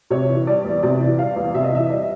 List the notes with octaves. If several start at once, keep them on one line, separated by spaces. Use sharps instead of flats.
C3 C#5
E3
G3 D5
E2
C3 D5
E3
G3 F5
E2
C3 E5
D#5
E3 E5
G3 D#5